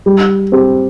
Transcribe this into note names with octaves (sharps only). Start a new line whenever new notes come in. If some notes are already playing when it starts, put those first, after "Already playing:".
G3
C4 G4